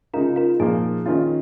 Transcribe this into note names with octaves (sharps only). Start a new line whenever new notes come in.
C#3 G#3 D#4 F4 A#4
F4 A#4
A#2 F3 A#3 D#4 G#4
D#3 C#4 F4